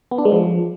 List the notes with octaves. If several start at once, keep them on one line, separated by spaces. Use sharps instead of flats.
B3
D4
G#3
F3